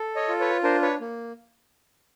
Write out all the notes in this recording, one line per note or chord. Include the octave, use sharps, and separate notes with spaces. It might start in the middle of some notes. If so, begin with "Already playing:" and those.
Already playing: A4
C#5 D#5
F4
B4 C#5
D4 A#4 C5
B4 C#5
A#3